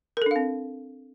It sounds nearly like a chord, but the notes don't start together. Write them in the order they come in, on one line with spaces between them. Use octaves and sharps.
A#4 A4 D4 F5 C4